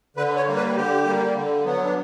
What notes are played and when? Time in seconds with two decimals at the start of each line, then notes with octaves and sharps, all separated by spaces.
0.17 D3 B4
0.36 C#5
0.47 G3 A#3
0.56 B4
0.76 D3 G4
1.05 G3 A#3
1.35 D3
1.65 F#3 B3
1.84 D4